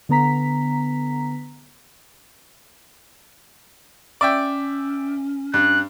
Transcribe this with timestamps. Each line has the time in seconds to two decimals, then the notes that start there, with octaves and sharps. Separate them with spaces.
0.09 D3 B3 A#5 B6
4.21 C#4 D5 E5 G5
5.54 G2 F#6